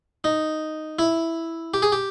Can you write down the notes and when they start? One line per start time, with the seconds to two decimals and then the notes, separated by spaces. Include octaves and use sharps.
0.24 D#4
0.99 E4
1.74 G4
1.82 G#4
1.92 G4